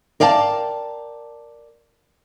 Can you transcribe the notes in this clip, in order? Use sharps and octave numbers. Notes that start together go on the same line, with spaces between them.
A#4 D5 F5 G5 A5